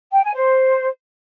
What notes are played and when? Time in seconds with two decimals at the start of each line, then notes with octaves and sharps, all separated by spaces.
0.13 G5
0.23 G#5
0.34 C5